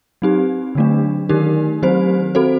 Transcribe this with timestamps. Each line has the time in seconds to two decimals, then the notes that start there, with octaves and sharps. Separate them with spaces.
0.22 F#3 C4 D#4 G4
0.75 D3 F#3 A3 D4
1.29 D#3 A3 D#4 G4 A#4
1.82 D#3 F#3 C4 G4 C5
2.35 C4 F#4 A4 C5